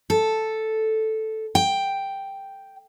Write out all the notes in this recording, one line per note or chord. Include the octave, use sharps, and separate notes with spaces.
A4
G5